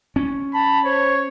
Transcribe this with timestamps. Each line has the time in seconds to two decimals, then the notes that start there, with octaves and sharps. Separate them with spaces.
0.16 C#4
0.54 A5 B5
0.85 C5 C#5